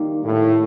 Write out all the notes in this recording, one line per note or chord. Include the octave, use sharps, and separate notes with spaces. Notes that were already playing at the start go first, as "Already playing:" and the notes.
Already playing: D#3 G3 A#3 D#4 G4
A2